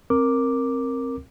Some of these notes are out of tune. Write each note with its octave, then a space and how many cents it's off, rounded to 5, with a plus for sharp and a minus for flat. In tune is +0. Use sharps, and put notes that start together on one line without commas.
C4 +20 A#4 +0 D6 +0